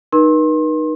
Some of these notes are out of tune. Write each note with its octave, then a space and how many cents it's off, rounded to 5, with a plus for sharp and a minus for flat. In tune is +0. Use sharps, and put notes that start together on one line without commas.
D#4 -15 B4 -45 C6 +35